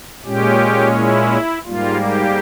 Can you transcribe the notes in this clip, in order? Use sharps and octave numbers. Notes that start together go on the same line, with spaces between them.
A#2 G#3 C#4 G4
E4
G#2 G3 A#3 F4
G4